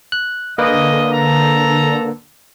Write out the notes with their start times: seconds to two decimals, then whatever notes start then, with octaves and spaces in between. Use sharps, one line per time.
0.12 F#6
0.58 D3 G#3 A#3 A#4 B4 D#5
1.13 A4 A#5